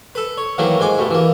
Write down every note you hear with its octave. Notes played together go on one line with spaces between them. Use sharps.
A4 B4
C#5
D#3 E3 F#3 A3 A#3
G#2 G#3 G#5 D6
G2 B2 A3
E3 A#3